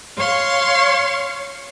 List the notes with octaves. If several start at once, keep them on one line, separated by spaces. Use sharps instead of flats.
C#5 F5 C6 C#6